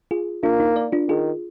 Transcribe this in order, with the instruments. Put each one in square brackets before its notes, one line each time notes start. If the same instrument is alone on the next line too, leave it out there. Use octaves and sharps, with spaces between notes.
[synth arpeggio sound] F4 G#4
[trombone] A#3 [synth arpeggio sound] D4 F4
[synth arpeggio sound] D#4
A#4 D5
D4 F4
[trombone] D#3 [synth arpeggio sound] F4 G#4